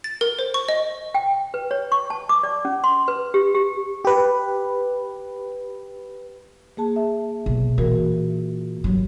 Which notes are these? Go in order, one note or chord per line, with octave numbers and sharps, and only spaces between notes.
A6
A#4
C5
C#6
D#5
G5
B4
C#5
C#6
A5
D6
D5
C#4
C6
B4
G4
G4
G4 B4
A#3 G#4 A5
E5
B1
A#2 E3 F#4 A#4
G2 F#3